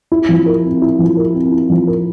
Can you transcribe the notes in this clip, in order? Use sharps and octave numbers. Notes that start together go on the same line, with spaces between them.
E4
F3
A#4
C4
E4
F3
A#4
C4
E4
F3
A#4